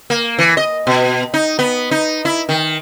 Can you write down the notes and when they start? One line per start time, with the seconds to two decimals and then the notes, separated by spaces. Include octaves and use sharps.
0.10 A#3
0.38 E3
0.57 D#5
0.87 B2
1.34 D#4
1.59 B3
1.91 D#4
2.25 E4
2.49 D#3